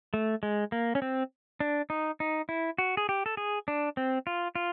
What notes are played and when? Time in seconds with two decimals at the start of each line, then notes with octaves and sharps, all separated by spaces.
0.14 A3
0.43 G#3
0.72 A#3
0.95 C#4
1.02 C4
1.60 D4
1.90 D#4
2.20 D#4
2.49 E4
2.78 F#4
2.97 G#4
3.09 G4
3.26 A4
3.37 G#4
3.68 D4
3.97 C4
4.27 F4
4.55 F4